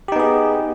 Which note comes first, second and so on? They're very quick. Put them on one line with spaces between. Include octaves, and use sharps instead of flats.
G4 D#4 B3 G#4